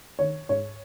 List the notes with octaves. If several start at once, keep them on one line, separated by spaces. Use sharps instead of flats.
D#3 C#5
G#2 C#5